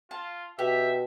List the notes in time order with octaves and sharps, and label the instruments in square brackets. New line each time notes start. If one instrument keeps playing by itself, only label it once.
[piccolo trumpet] F4 [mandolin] A5
[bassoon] B2 [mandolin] G4 [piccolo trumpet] E5